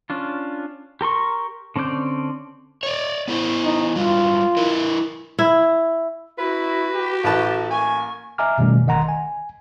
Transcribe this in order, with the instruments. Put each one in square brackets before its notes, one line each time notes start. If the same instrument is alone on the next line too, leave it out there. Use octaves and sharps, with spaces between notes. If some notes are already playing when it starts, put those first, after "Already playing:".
[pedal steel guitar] C#4 D4 F4
G4 A#4 C6 C#6
D3 C4 C#4 D5 G6
[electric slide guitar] C#5 D5
B3 E4 C5
[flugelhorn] D#4
[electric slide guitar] F#3 G3 B4 [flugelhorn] F4
[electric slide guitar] E4 A#4 B4
[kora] E4
[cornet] E4 [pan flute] F#4 [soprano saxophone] B4
[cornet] G4
[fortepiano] A1 B4 A5 [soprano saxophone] A4
[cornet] A#3 [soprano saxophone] G#5 [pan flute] C#6
[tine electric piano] D#5 E5 G#5 A#5 D6 F6
F#2 B2 D#3 G3 A3 C#4
G1 D#3 D#5 F#5 A#5 C6
G#5